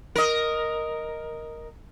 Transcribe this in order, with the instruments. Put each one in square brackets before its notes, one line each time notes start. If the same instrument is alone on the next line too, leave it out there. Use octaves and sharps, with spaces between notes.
[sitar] A#4 D#5